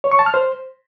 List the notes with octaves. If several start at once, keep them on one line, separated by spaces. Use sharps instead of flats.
C#5
C#6
A5
F6
C5